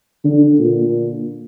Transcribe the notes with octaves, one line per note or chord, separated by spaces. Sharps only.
D3
A#2